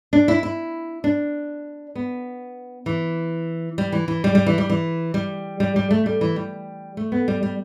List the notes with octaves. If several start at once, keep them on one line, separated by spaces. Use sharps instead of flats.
D4
E4
E4
D4
B3
E3
G3
E3
E3
G3
G3
E3
G3
E3
G3
G3
G3
A3
G3
E3
G3
A3
B3
G3
G3